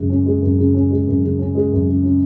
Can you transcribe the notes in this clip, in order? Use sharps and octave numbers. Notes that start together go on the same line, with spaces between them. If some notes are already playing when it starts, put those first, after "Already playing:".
Already playing: F#2 C#3 G#3
C#4
G#3
F#2
C#3
C#4
G#3
F#2
C#3
C#4
G#3
F#2
C#3
C#4